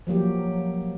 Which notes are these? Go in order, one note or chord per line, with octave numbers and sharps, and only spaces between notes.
F3 F#3 A#3 G4